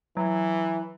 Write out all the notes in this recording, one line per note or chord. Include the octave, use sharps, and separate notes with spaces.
E3 F#3